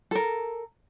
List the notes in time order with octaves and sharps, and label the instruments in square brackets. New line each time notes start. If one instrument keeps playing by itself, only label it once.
[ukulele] A4 A#4